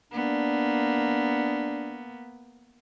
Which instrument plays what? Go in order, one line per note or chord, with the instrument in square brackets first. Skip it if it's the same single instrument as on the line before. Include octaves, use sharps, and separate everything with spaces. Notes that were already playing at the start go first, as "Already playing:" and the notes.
[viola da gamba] A#3 B3 [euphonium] D4